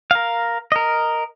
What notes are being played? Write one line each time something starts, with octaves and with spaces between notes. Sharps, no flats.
A#4 F5
A#4 D#5